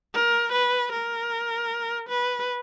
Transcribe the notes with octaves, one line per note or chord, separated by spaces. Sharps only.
A#4
B4
A#4
B4